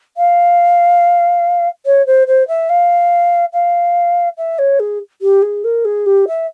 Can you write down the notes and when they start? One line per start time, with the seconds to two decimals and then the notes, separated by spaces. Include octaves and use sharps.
0.17 F5
1.86 C#5
2.06 C5
2.27 C5
2.48 E5
2.69 F5
3.53 F5
4.37 E5
4.58 C#5
4.79 G#4
5.21 G4
5.42 G#4
5.64 A#4
5.85 G#4
6.06 G4
6.27 E5